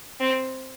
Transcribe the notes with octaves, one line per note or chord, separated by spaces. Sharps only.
C4